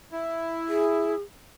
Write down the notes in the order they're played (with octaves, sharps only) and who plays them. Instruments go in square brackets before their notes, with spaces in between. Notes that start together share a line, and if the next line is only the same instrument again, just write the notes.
[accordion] E4
[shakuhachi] G#4